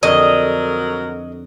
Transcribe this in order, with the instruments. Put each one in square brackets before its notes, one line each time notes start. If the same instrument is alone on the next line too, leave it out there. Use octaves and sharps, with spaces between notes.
[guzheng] F2 D3 [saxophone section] F#3 A#4 [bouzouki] D#5